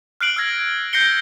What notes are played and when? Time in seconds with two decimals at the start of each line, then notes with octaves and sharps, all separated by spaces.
0.21 F6 F#6 C7 D7 F#7
0.36 E6 F6 G#6 A#6
0.93 G6 A#6 C7 C#7 G7